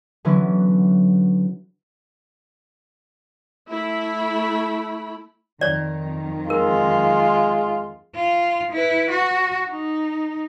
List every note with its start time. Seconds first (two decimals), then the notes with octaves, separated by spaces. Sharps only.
0.25 D3 E3 F#3 B3 C#4 E4
3.70 A3 E4 B5
5.61 F2 D#3 C#5 D5
6.50 G#3 F4 A#4
8.16 F4
8.72 E4 B4
9.11 F#4
9.70 D#4